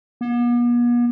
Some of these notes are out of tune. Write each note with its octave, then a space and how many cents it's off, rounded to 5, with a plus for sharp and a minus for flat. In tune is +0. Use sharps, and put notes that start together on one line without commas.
B3 -45